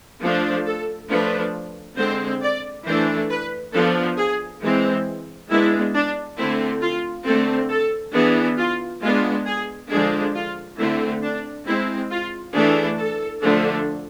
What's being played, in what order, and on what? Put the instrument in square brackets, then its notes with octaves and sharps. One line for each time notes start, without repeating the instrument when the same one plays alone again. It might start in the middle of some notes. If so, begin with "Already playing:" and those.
[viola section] F3 A3 D4
A4
F3 A3 D4 B4
D3 G#3 C4 C5
D5
E3 A3 D4 C5
B4
F3 B3 D4 A4
G#4
E3 G#3 C4
G#3 B3 D4 E4
D4
D3 A3 C4 E4
F4
D3 A3 C4 A4
A4
E3 B3 D4 G#4
F4
G#3 B3 D4 F4
G#4
D3 F3 G#3 D4 G#4
F4
D3 A3 C4 E4
D4
G#3 C4 E4
F4
E3 A3 D4 G#4
A4
D3 F3 A3 D4